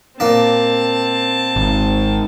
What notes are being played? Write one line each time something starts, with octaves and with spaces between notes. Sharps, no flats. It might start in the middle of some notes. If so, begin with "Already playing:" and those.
A#2 A#3 C4 D4 A5
G#1